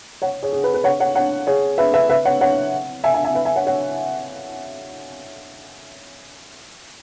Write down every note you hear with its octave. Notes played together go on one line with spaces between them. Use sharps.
C#5 F#5
G#4 C#5
G#4
B4
B4
C#5 F#5
C#5 F#5
C#5 F#5
G#4 C#5
B4 E5
B4 E5
B4 E5
C#5 F#5
C#5 F#5
E5 G#5
E5 G#5
E5 G#5
B4 E5
E5 G#5
C#5 F#5
C#5 F#5